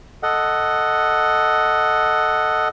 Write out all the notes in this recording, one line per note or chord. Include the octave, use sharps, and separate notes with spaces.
A4 D#5 F#5